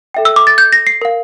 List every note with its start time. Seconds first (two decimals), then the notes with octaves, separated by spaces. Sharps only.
0.14 A4 E5 G5
0.25 E6
0.36 D6
0.47 A6
0.58 G6
0.73 A#6
0.87 C7
1.02 A#4 F5